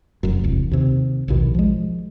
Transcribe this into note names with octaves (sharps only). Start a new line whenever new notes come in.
F1 F#2
E1 C2
D#2 C3
A#1 D#2 B2 D#3
F3 G#3